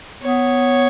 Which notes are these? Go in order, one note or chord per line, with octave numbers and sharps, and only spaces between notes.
B3 C#5